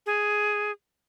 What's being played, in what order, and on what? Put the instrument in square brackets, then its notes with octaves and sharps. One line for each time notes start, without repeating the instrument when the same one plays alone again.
[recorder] G#4